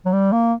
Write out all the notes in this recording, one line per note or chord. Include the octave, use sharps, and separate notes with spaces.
F#3
G3
A#3